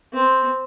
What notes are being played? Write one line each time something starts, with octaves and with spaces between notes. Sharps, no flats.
C4